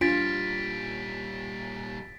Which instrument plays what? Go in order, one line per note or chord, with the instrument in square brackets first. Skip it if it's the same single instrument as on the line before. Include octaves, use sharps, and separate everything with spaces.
[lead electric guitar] A#2 G3 [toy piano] D4 [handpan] F4 [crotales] A6 B6 D7